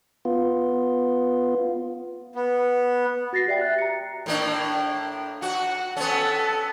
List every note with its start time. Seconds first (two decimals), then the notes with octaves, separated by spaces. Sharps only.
0.25 B3 F4
2.35 B3
3.33 F#4 A6 A#6 C7
3.47 G4 D5 E5 G5
3.60 E5 F#6 A6
3.78 A#5 C#7
4.26 A2 A#3 D4
5.42 F#4 F#5
5.97 B3 C#4 A4